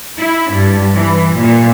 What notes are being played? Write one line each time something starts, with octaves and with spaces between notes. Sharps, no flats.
E4
G2
E3
A#2